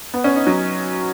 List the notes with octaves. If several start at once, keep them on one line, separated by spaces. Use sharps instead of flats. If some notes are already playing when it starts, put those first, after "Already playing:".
B3
C#4
D#4
F#3